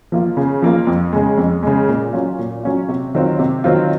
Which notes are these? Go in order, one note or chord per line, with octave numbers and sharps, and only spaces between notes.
F3 A#3 F4
C#3
F3 A#3 F4
F2
C#3 G#3
F2
C#3 G#3
A#2
F#3 C#4 F4
A#2
F#3 C#4 F4
C3
D#3 F#3 C4 F4
C3
D#3 F#3 C4 F4